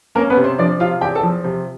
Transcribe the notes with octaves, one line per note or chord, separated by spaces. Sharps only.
A#3 C#4 A#4
B3 B4
C3
C4 C5
F3 D4 D5
C3 F4 F5
E2 G4 G5
A4 A5
F3
C3